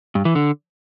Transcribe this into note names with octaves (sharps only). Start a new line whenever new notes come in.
G2
E3
D3